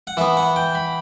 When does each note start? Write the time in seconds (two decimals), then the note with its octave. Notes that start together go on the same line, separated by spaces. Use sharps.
0.07 F#5
0.17 E3 B3 E5
0.37 F#5
0.56 G5
0.75 B5